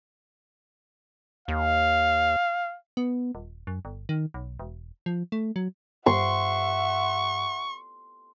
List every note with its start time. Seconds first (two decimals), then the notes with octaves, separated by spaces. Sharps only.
1.48 D#2 F5
2.97 B3
3.35 D#1
3.67 F#2
3.85 G1
4.09 D#3
4.34 B1
4.59 E1
5.06 F3
5.32 A3
5.56 F#3
6.06 G2 E5 F#5 C6 C#6